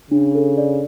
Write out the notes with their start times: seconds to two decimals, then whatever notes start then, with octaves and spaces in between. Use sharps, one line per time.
0.11 C#3 D4
0.35 A4
0.58 D5